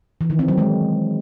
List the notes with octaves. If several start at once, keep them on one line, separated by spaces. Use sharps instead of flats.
E3
D#3
C4
F#3
G#3